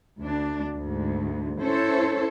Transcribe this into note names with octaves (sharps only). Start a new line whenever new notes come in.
D2 D4
D2 G#2
C#4 E4 A4 C5 C#5